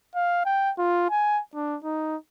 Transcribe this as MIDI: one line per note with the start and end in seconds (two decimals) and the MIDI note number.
0.15 0.45 77
0.45 0.71 79
0.78 1.08 65
1.10 1.40 80
1.54 1.77 62
1.84 2.16 63